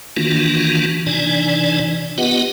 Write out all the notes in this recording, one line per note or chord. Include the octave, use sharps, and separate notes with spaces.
D#3 E3 A#3 D4 F4 F#4
C3 E3 D4 D#4 D5 G#5
B3 F4 G4 B4 D#5 F#5